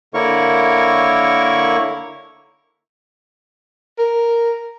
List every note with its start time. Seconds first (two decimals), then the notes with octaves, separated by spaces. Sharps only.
0.14 D3 A#3 E4 A#4 C#5 C#6
3.99 A#4